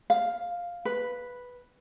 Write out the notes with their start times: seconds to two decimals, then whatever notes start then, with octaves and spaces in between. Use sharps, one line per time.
0.10 F5
0.85 B4